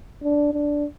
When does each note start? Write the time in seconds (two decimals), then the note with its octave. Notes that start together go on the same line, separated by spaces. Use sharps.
0.23 D4
0.53 D4